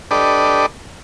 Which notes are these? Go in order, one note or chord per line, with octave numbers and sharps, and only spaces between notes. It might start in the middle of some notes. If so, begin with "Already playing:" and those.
D4 G4 A4 B4 D5 D#5